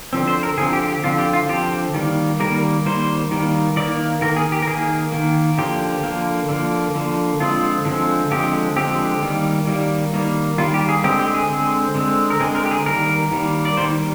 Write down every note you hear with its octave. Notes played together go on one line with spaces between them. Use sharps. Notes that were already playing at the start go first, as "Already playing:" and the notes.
D3 F3 C4
C5
A#4
D3 F3 C4 G#4
G4
G4
D3 F3 C4 F4
G4
F4
D3 F3 C4 G4
D#3 G3 A#3
D#3 G3 A#3 A#4
D#3 G3 A#3 C5
D#3 G3 A#3
D#3 A#3 D5
D#3 A#3 A#4
G#4
G4
A#4
D#3 A#3 G#4
D#3 A#3
D3 F3 A#3 G4
D3 F3 A#3
D3 F3 A#3
D3 F3 A#3
D3 F3 G#3 C4 F4
D3 F3 G#3 C4
D3 F3 G#3 C4 G4
D3 F3 G#3 C4 G4
D#3 G3 A#3
D#3 G3 A#3
D#3 G3 A#3
D#3 G3 A#3 F4
G4
G#4
D3 G#3 C4 G4
G4
G#4
D3 G#3 C4
D3 G#3 C4
A#4
D3 G#3 C4 G#4
A#4
G4
G#4
D#3 G3 A#3 A#4
D#3 G3 A#3
D5
D#3 G3 A#3 C5